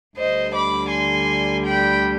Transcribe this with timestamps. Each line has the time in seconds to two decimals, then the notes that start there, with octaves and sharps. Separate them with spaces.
0.17 D2 D3 G3 C5 D#5
0.55 B5 D6
0.91 G#5 C6
1.64 G5 B5